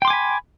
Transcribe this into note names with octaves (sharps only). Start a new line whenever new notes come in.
G5 G#5 B5 C6 D6